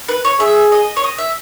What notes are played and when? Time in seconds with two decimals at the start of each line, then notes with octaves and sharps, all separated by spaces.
0.09 B4
0.25 C#5
0.40 G#4 E5
0.72 D#5
0.97 C#5
1.04 D#5
1.18 E5